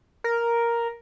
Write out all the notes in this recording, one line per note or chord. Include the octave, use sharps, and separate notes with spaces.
A#4